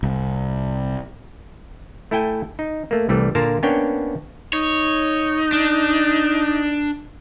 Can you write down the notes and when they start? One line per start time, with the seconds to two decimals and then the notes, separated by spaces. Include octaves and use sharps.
0.03 C2
2.11 A3 E4 A4 G5 G#5
2.59 D#4
2.91 A3 A#3
3.09 C2 E3 G3 A3
3.35 A#2 D3 A#3 F4 A#4 A5
3.63 A#3 B3 C#4 D4 C#5 G5
4.53 D#4 C#5
5.53 D4